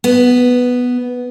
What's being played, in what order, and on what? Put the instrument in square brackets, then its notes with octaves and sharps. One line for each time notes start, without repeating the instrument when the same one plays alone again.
[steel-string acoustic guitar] B3